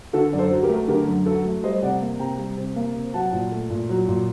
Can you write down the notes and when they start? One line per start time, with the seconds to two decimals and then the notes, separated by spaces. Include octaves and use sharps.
0.13 D3 F#4 A4
0.32 F#2 D5
0.38 A4 C5
0.51 F#3
0.63 G4 A#4
0.69 A3
0.88 D3 G4 A#4
1.07 F#2
1.26 F#3 F#4 A4
1.45 A3
1.63 G3 C5 D#5
1.82 C3 D5 F#5
2.02 A#3
2.19 C3 G5 A#5
2.38 G3
2.57 C3
2.76 A#3
2.95 C3
3.14 F#3 F#5 A5
3.33 A#2
3.52 A3
3.70 A#2
3.89 F#3
4.08 A#2